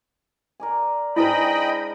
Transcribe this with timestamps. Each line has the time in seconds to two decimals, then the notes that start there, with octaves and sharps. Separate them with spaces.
0.60 A#4 D5 G#5
1.16 G#2 D4 E4 G#4 B4 D#5 G5 B5